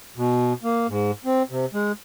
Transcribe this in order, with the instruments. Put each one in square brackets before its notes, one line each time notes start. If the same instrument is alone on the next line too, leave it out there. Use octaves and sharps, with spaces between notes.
[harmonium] B2
A#3
G#2
C4
C3
G#3